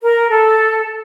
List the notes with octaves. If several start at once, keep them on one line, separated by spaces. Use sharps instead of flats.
A#4
A4